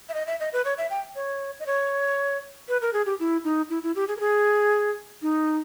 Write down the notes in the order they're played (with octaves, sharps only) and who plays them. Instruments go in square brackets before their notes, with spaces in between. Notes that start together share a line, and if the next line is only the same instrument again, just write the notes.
[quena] E5
D#5
E5
D#5
B4
C#5
E5
G5
C#5
D#5
C#5
B4
A#4
G#4
G4
E4
D#4
E4
E4
G4
G#4
A#4
G#4
D#4